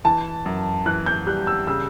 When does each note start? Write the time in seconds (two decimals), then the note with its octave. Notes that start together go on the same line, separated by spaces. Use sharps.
0.04 E3 A5
0.46 F#2
0.86 E3 F#6
1.06 G6
1.27 G3 F#6
1.47 E6
1.67 C#3 E6